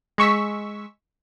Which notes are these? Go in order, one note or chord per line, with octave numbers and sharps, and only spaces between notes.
G#3 C#6 E6 B6